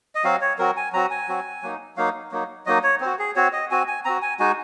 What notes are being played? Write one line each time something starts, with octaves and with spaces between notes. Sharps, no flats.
D#5
F#3 C4 F#4 F5
C#5
F#3 C4 F#4 A#4
G#5
F#3 C4 F#4 A#5
G#5
F#3 C4 F#4
F#3 A#3 D#4
F#3 A#3 D#4 F5
F#3 A#3 D#4
F#3 A#3 D#4 D#5
C#5
C4 F#4 C5
G#4
C4 F#4 C#5
D#5
C4 F#4 G#5
G#5
C4 F#4 A#5
G#5
G#3 D#4 F#4 G#5